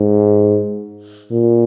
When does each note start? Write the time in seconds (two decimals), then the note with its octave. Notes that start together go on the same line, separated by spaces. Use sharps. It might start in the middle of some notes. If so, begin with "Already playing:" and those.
Already playing: G#2
1.32 A#2